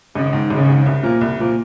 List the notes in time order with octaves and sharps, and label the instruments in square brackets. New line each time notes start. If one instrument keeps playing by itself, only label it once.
[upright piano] G#1 [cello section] C#3
[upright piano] G#2 D#3
[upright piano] G#1 [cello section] C#3
[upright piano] G#2 D#3
C2
A#2 F3 A#3
C2
A#2 F3 A#3